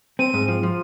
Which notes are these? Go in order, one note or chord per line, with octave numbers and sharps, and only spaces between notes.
C4 D#7
G#2
F3
F3